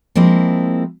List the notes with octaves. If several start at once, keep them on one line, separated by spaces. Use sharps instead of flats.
F3 G#3 A#3 C4 E4